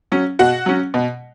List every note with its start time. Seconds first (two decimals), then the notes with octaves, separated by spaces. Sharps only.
0.12 F#3 C#4
0.39 B2 F#4 F#5
0.66 F#3 C#4
0.94 B2